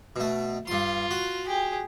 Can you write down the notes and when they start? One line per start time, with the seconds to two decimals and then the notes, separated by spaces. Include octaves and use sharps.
0.16 B2 A3
0.67 G2 F4 C6
1.11 F#4
1.46 G4 G#4